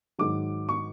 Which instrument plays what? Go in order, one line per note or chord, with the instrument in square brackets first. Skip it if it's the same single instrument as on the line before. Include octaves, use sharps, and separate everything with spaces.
[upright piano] G#2 D#3 F#3 D6
C#6